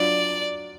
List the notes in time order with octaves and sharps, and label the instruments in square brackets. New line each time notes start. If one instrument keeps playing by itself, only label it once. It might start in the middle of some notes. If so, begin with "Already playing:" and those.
Already playing: [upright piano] F#3 D4 F4 [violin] D5